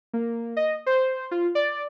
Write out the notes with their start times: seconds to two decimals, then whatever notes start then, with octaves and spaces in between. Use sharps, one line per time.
0.13 A#3
0.57 D#5
0.86 C5
1.31 F4
1.55 D5